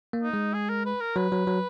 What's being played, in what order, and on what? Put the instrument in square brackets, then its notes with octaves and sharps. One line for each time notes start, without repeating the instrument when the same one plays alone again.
[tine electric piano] A#3
[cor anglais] D#4
[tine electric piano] G#3
[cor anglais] G#4
A#4
B4
A#4
[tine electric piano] F#3 [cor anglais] B4
[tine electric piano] F#3
F#3